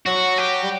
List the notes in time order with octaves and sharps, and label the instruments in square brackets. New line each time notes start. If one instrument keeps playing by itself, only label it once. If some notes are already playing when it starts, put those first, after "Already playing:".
[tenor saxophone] F#3 [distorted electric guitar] F#4
[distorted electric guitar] G4
[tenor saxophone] G3